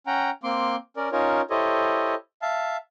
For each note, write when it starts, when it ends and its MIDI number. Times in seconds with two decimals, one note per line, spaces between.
0.07 0.30 61
0.07 0.30 78
0.07 0.30 79
0.07 0.30 82
0.43 0.76 58
0.43 0.76 60
0.43 0.76 84
0.43 0.76 86
0.97 1.09 61
0.97 1.09 70
0.97 1.09 74
1.12 1.41 61
1.12 1.41 63
1.12 1.41 65
1.12 1.41 70
1.12 1.41 73
1.50 2.15 64
1.50 2.15 67
1.50 2.15 69
1.50 2.15 72
1.50 2.15 73
1.50 2.15 75
2.42 2.77 76
2.42 2.77 77
2.42 2.77 81